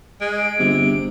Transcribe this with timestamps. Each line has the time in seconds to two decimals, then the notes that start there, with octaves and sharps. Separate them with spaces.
0.21 G#3 D7
0.59 G1 C3